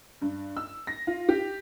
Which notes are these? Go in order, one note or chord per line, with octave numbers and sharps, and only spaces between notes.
G2
E6
A#6
F4
G4